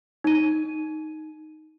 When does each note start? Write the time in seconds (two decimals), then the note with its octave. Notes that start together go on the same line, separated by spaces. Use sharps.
0.24 D#4 D#7